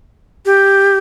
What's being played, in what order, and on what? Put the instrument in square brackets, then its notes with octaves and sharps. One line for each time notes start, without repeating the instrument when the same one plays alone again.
[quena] G4